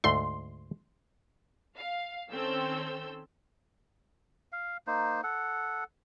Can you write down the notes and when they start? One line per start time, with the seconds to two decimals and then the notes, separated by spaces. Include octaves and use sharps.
0.04 D2 G#2 A3 C6
1.78 F5
2.31 D#3 C4 C#4 A4 E6 G6
4.52 F5
4.87 A#3 D#4 C5
5.23 A4 F#5